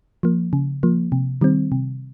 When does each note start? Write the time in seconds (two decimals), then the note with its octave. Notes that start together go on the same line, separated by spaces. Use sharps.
0.23 F3 A#3
0.53 C#3
0.83 F3 A#3
1.12 C3
1.41 D#3 G3 C4
1.72 C3